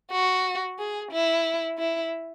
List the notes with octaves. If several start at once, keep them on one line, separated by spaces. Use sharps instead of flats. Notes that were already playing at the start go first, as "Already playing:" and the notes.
F#4
G#4
E4
E4